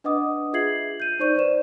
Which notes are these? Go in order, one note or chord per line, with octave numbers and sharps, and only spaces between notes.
D4 B4 D#5 F#5 D6 D#6
F4 G#4 E5 G#6 C7 F#7
G6 D#7
D#4 C5 D5 C#6 G6 D#7
B4 C5 D5 E7